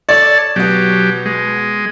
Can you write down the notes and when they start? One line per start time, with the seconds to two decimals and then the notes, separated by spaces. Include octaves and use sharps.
0.09 A4 C#5 D5 A5
0.56 B2 F#3 B3 G4
1.25 G#3